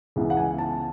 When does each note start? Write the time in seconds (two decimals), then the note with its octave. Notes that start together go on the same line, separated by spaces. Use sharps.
0.16 C#2 C#3 E3 B3
0.30 F#5
0.37 G#5
0.58 A5